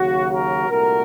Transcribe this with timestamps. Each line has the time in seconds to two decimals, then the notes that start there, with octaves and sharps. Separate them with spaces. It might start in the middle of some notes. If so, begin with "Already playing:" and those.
Already playing: D#2 C#3 F#3 F#4
0.31 F#4 A#4
0.69 C2 A#2 A3 F#4 A#4